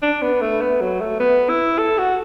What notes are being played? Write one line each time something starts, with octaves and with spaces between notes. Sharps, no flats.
D4
B3
A3
B3
F#3
A3
B3
E4
A4
F#4